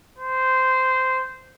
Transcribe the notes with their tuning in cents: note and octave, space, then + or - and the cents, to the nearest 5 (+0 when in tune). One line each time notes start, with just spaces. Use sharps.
C5 -15